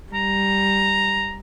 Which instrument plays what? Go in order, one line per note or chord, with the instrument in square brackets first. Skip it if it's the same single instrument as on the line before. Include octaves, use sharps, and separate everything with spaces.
[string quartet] G3 [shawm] A#5